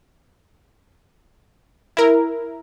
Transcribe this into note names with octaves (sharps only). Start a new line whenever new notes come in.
E4 A#4